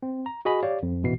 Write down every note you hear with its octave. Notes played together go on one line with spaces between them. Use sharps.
C4
A#5
F#4 G#4 D#5 G#5 B5
G4 C#5 D5 F5
F2
A1 B2 E3 C7